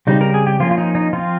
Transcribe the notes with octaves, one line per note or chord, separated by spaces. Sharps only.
C#3 G3 C4 D#4
A#4
G#4
G4
F3 A#3 C#4 F4
F4
D#4
D#4
F3 C4 F4